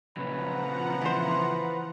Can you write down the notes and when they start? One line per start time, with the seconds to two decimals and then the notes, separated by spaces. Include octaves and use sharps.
0.17 A#2 C#3 F3 F#3 B4 F#5 A#5
1.01 E3 C5